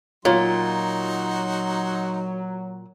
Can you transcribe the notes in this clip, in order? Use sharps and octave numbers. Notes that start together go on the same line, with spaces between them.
A#2 F#3 D#4 F4 F#4 C#5 C6